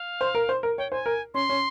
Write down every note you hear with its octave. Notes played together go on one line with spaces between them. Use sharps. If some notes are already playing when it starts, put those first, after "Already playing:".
Already playing: F5
C5
A#4
C5
A#4
C#5 G5
C5 G#5
A#4
C#4 C6
C#4